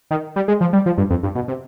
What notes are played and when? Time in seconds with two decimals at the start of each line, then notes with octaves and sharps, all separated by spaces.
0.11 D#3
0.36 G3
0.48 G#3
0.61 F3
0.73 G3
0.86 F3
0.98 G2
1.10 F2
1.23 G2
1.35 B2
1.48 C3